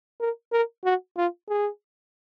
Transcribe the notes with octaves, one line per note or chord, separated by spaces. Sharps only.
A#4
A#4
F#4
F4
G#4